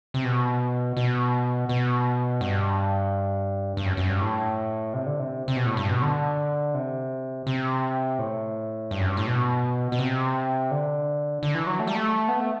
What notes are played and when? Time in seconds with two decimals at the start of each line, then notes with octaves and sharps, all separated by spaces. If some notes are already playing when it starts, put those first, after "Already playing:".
0.14 C3
0.25 B2
0.97 B2
1.69 B2
2.41 G2
3.77 G2
3.86 F#2
3.97 F#2
4.09 G2
4.21 A2
4.94 C3
5.06 D3
5.20 C3
5.48 C3
5.56 B2
5.66 A2
5.77 G2
5.90 B2
6.02 D3
6.74 C3
7.47 C3
8.19 A2
8.91 G2
9.00 F#2
9.08 G2
9.17 A2
9.27 B2
9.92 B2
9.99 C3
10.71 D3
11.43 D3
11.55 E3
11.67 F#3
11.80 A3
11.87 G3
11.95 A3
12.28 B3
12.40 A3